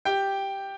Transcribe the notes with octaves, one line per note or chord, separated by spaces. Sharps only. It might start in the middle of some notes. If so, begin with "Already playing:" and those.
G4 G5